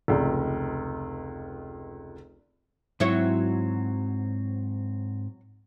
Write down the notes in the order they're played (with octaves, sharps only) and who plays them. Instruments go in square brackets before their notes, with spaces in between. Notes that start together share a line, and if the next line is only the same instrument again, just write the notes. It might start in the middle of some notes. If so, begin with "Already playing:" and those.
[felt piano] F1 C#2
[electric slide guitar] G#2 C4 [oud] F#3 E4 C#5